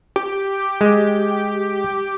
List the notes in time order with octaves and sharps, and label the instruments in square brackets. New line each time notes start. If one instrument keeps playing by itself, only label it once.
[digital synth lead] G4
[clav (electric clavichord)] G#3